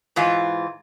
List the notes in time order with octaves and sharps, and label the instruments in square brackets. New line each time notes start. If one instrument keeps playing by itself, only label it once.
[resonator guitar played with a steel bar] G#2 E3 F4